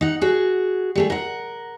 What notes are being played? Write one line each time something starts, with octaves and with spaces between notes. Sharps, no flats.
D#4 F#5
F#4 G#4
G3 A3 G#4
A#4 F#5